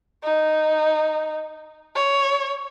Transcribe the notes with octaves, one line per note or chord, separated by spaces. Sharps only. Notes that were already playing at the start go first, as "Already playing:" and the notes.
D#4
C#5